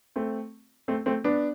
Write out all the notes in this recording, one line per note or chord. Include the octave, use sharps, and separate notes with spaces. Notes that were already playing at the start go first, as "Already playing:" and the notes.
A3 C4
A3 C4
A3 C4
B3 D4